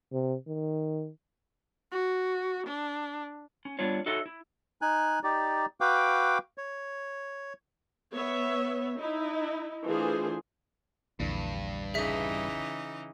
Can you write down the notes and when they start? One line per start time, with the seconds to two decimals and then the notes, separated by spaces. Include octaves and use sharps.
0.12 C3
0.48 D#3
1.92 F#4
2.67 D4
3.65 C#4
3.79 G3 B3 D4 F4 C#5
4.06 D#4 F#4 A4 C#5 D#5 E5
4.26 E4
4.82 D#4 G#5 F#6
5.23 D#4 G4 D5
5.81 F#4 B4 F5 G5 D6
6.58 C#5
8.12 B3 C#5 E5
8.97 D#4 E4
9.85 E3 A3 D4 F4 G#4 C5
11.20 A#1 E2 G2 D3
11.94 C#3 E3 D#4 G#4 E5 B6